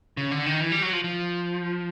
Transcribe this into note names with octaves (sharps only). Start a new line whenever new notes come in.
C#3
D3
D#3
E3
G3
F#3
F3
F3